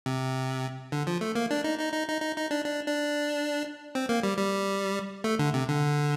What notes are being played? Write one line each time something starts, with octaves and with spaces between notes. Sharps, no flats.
C3
D3
F3
A3
A#3
D4
D#4
D#4
D#4
D#4
D#4
D#4
D4
D4
D4
C4
A#3
G3
G3
A3
D3
C3
D3